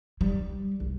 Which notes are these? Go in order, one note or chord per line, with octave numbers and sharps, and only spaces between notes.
G3
C2